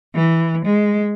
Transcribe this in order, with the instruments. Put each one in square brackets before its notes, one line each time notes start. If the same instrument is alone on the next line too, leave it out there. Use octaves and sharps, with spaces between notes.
[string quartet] E3
G#3